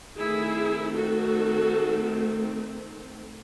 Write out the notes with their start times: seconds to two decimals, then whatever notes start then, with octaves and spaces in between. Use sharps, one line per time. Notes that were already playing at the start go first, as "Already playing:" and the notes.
0.17 D#3 A3 C4 E4 G#4
0.94 F#4 A4